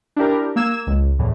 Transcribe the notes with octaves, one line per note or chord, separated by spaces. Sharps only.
D4 E4 G4 A#4
A#3 E6 G#6 E7
C#2
E2 A2 E3